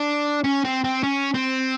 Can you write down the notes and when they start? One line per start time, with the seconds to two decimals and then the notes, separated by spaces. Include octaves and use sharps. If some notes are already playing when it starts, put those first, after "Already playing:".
Already playing: D4
0.44 C#4
0.64 C4
0.84 C4
1.03 C#4
1.34 C4